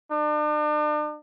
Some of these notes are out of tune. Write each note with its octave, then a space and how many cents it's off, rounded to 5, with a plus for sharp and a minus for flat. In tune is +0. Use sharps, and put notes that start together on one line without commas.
D4 +40